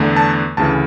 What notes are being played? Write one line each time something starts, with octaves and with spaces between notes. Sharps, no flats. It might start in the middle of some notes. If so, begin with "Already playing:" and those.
Already playing: E2 D3 A3
A5
D2 C#3 E3 A5